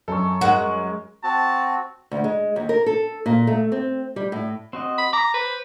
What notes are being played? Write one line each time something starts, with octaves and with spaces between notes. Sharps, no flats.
F#2 A4 C#6
G#3 F#4 A#4
C4 F#4 A5
D2
G#3
D#2
A#4
A4
A#2
A3
C4
G3
A2
C4 F#4 D#5
B5
A#5 D6
B4 C5